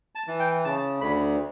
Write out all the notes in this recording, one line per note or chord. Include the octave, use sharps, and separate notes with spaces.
A5
E3
G5
C#3 A5
D2 B5